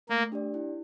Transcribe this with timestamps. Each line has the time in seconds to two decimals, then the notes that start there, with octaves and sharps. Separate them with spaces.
0.09 A3 A#3
0.32 D4 G4 D5
0.54 E4